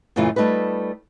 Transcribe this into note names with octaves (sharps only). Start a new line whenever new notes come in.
F#2 A#2 C#3 E3 A3 F4
G3 A3 D#4 F4 B4